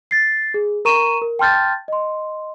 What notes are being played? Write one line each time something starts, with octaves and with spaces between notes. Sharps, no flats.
A6 C7
G#4
A#4 A#5 C#6 D#7 E7
A#4
G5 A5 C6 F6 G6 A6
D#5 C6